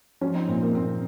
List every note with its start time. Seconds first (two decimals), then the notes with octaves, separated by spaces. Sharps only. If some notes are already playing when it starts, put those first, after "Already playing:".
0.21 F3 C#4 F4
0.35 C4 D#4
0.48 A#2 C4
0.62 A#3
0.75 A#2 C4